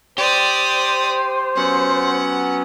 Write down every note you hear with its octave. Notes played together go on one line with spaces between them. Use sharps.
G4 C5 D5 D#6
F#3 B3 C#4 F#5